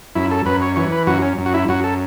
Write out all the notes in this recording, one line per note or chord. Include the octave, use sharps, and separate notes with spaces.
F#2 E4
A4
F#2 B4
C#5
E3 C#5
B4
F#2 F#4
C#4
F#2
F#4
E4
F#2 F#4
A4